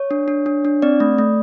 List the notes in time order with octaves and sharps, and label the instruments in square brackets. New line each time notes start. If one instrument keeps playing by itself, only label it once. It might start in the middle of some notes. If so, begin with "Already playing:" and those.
Already playing: [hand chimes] C#5
D4
D4
D4
D4
C4 D5
A3
A3